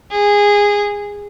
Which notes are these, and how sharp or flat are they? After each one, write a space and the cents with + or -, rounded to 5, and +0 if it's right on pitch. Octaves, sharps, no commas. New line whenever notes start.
G#4 -15